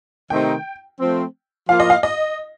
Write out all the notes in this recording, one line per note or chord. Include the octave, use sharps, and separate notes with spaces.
C3 D#3 A3 C4 D#4 G5
F3 A3 C4
F3 A#3 F4 F5
D#5
F5
D#5